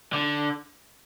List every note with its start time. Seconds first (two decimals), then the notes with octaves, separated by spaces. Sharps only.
0.13 D3